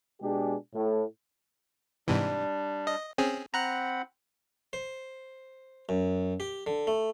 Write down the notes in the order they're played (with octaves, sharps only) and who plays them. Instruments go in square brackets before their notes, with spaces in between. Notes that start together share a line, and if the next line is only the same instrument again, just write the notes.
[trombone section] B2 G#3 D4 G4 G#4
A2
[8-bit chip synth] G#2 C3 E3 [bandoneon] G3 D4
[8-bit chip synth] D#5
C4 C#4 G#4
[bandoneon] C4 F#5 B5 [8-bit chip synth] A#5 F#6
[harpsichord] C5
F#2
G4
D3
A3